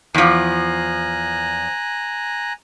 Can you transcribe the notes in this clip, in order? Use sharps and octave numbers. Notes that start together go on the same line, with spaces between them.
E2 F3 G#5 A#5 F#6